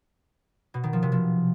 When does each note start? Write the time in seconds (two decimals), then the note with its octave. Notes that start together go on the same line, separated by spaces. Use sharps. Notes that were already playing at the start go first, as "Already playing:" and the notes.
0.74 B2
0.83 D#3
0.93 F3
1.02 C3
1.12 F3